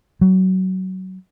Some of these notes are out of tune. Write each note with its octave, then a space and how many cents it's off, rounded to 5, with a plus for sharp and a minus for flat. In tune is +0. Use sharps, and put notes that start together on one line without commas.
F#3 +20